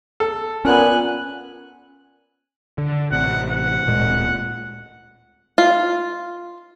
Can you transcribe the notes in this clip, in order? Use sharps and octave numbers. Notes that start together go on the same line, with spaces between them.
A4
A#2 B3 C#4 G#5 F#6
D3
A1 C3 F#5
F#5
D1 A#2 G#3
F4